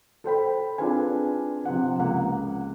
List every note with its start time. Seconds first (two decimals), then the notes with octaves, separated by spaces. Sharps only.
0.24 A4 C5 G5 B5
0.78 C4 D4 F4 G#4 B4 G#5
1.65 C3 F3 F#5
1.99 C#2 A#3 F#5